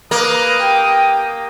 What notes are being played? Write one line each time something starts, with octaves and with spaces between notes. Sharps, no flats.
A#3 B4 D#6
G4 G5